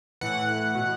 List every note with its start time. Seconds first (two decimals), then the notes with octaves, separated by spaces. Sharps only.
0.21 A2 E3 F#5
0.75 B2